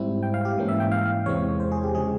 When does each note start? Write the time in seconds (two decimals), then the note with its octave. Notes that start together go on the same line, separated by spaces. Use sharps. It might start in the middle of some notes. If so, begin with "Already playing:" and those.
Already playing: G#2 G3 C4 E4
0.23 G5
0.34 F5
0.45 G4
0.57 G#2 E3 A#3 C#4
0.68 E5
0.80 G5
0.92 F5
1.26 E2 C3 E3 G#3 C4 C#5
1.60 C5
1.72 G#4
1.83 G4
1.94 C#3 F3 G#3 G#4